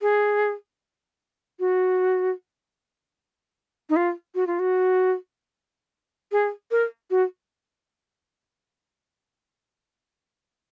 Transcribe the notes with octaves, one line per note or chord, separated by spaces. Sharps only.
G#4
F#4
D#4
F4
F#4
F4
F#4
G#4
A#4
F#4